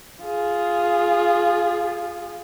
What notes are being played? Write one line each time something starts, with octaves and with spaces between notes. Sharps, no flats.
F4 G#4